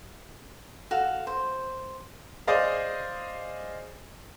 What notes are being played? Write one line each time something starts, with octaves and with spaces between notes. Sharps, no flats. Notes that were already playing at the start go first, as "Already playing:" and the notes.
F#4 A4 F5
C5
G#4 C5 D5 D#5 F5